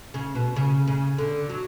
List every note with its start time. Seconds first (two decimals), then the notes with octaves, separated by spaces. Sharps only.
0.14 C#3
0.35 B2
0.56 C#3
0.87 C#3
1.18 D3
1.49 F#3